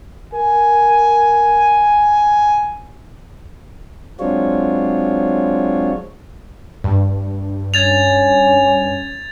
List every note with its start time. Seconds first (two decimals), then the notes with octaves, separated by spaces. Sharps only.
0.34 A#4 G#5
4.20 F#3 G#3 C4 D4 F4 C#5
6.84 G2
7.74 C#4 G#6 A6 F7